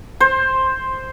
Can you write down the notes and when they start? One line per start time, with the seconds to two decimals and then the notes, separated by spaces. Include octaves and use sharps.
0.20 C5